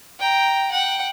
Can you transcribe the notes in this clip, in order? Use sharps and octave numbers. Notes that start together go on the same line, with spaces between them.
G5 A#5
F#5 G5